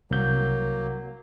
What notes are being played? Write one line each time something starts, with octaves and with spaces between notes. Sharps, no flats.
C2 F#3 A#3 G6